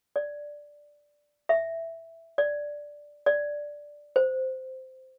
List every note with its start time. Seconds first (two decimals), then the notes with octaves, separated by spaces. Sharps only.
0.16 D5
1.49 E5
2.38 D5
3.26 D5
4.16 C5